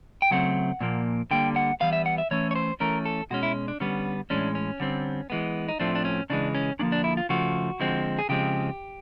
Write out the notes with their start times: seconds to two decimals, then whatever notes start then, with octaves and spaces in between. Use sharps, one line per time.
0.22 G5
0.31 C#3 F#3 A3 C4 F#5
0.81 A#2 F3 A#3
1.31 D3 G3 A#3 G5
1.56 F#5
1.80 E3 G3 B3 F5
1.93 E5
2.06 F#5
2.18 E5
2.31 E3 A3 C#4 C#5
2.51 C#5
2.55 C5
2.80 E3 A3 C#4 A#4
3.05 A4
3.30 B2 G#3 C#4 F#4
3.43 E4
3.68 D4
3.80 D3 G3 B3 C#4
4.30 A2 E3 G#3 C#4 D4
4.55 C#4
4.80 D3 G3 C4
5.30 E3 G#3 B3
5.68 D#4
5.80 A2 F3 A3 C4 D4
5.95 D4
6.05 C#4
6.30 C#3 E3 G#3 D4
6.55 C#4
6.79 D3 F3 A#3 C#4 D4
6.92 D4
7.04 E4
7.17 F4
7.29 C#3 F3 A3 F#4
7.80 D3 F3 G#3 C4
8.19 G#4
8.29 C#3 F3 G#3 C4 G4